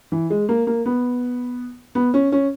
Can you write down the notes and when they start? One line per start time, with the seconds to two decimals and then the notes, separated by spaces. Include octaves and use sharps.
0.12 E3
0.30 G#3
0.49 A#3
0.67 A#3
0.86 B3
1.95 B3
2.14 C#4
2.32 C#4